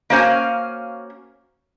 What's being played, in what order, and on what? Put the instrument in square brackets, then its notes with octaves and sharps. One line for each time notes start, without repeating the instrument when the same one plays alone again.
[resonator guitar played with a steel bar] A#3 C#4 F#4 C5 F5 G#5